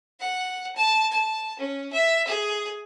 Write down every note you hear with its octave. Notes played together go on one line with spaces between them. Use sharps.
F#5
A5
A5
C#4
E5
G#4